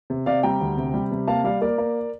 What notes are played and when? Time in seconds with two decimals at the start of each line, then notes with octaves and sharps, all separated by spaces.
0.10 C3
0.26 C3 D5 F5
0.43 G3 G5 A#5
0.61 D2
0.77 C3
0.94 G3
1.12 C3
1.27 A#3 F5 A5
1.44 G3 D5 F5
1.61 A#3 A#4 D5
1.78 A#3